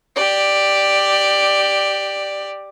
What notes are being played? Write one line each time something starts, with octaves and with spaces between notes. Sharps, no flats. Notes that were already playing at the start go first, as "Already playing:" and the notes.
G4 D5